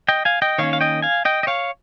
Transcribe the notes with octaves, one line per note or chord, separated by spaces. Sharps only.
D#5 G5
F5 G#5
D#5 G5
D#3 A#3 C#4 C#5 F5
F5
D#5 G5
F5 G#5
D#5 G5
D#5
C#5 F5